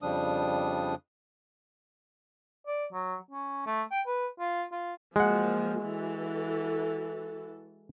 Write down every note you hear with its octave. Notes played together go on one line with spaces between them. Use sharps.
F2 C#3 F3 G3 D4 D#6
D5
F#3
C#4
A3
G5
B4
F4
F4
F3 F#3 G#3 A#3 F#5
E3 F#4 A4